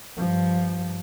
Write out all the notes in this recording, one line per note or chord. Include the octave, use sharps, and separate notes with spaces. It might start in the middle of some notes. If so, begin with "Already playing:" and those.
G2 F3